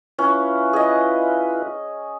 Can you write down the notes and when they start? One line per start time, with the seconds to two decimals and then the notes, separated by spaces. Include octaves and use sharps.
0.19 C#4 E4 F4 B4
0.73 G#4 D#5